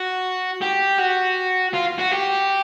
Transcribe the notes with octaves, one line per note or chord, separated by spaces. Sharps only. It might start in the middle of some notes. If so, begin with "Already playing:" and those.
Already playing: F#4
G4
F#4
F4
F#4
G4